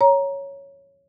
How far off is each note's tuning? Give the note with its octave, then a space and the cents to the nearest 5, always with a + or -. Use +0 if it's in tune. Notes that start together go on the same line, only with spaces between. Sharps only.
C#5 +0 A#5 +10